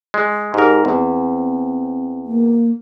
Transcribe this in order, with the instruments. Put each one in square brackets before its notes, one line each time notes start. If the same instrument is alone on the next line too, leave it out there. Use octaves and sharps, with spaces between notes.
[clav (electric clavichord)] G#3
[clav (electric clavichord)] G#2 A#4 [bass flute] G4
[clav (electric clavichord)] E2 [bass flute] C4
[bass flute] A#3